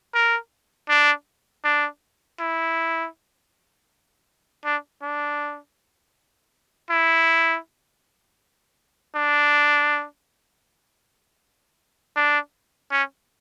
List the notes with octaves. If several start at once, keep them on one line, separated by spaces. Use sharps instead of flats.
A#4
D4
D4
E4
D4
D4
E4
D4
D4
C#4